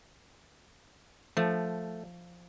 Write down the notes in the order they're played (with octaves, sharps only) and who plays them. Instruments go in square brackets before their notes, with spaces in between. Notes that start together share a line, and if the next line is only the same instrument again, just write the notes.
[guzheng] F3 [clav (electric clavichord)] A3